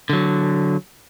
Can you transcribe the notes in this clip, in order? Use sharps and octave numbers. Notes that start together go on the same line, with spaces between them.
D3 F#3